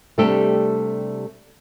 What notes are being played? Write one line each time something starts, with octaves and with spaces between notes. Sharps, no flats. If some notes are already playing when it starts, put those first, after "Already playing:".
C3 G3 A3 D4 G4 A4